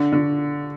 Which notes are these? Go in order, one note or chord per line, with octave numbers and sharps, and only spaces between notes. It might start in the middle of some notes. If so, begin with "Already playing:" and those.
Already playing: D3
D3